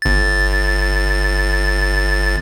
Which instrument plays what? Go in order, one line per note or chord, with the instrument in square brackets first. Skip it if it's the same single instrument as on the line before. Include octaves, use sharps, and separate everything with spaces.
[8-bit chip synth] G1 A6